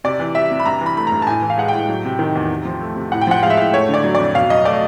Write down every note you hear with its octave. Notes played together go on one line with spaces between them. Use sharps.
C3 D5
E3
G3 E5
C3
B5
G2 A#5
E3
B5
A3 B5
G2 A#5
A5
A2 G#5
E3
F5
G#3 F#5
G5
A2
F#3
C3
D#3
E2
C3
F3
A3
C3
A2 F#5
G5
F3 F#5
G#3 F5
E5
A2 F5
A3 C#5
D3 D5
F#3
F2 D5
B2 F5
F#3 D#5
A3 D5